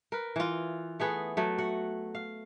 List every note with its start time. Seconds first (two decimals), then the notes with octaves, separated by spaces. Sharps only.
0.12 A#4 B4
0.36 E3 F4
1.00 A3 B3 G#4 B4
1.37 F#3 A3
1.58 F#4 F#5
2.15 F5